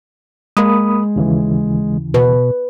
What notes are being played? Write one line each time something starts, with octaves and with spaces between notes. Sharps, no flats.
G#3 A#3 B5 D#6
D#2 C#3 E3
B2 B4